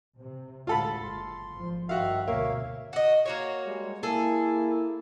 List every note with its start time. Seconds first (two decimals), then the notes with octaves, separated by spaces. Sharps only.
0.18 C3
0.67 D2 A2 G#3 F4 A4 B5
1.03 F#1 C6
1.53 G#1 F3
1.89 G2 D#3 F#4 E5 F5
2.28 D2 G#2 B2 A#3 C#5 E5 F5
2.93 F#4 D#5
3.26 A#3 F#4 C#5
3.64 G3 G#3
4.03 A#3 E4 G#4 A4